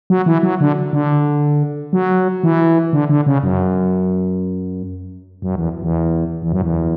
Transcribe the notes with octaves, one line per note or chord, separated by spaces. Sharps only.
F#3
E3
F#3
D3
D3
F#3
E3
D3
D3
C#3
F#2
F#2
E2
E2
E2
F#2
E2